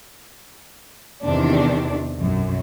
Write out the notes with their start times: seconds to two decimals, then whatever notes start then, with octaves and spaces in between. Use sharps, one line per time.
1.25 E2 C3 D#3 D4
2.17 B1 F#2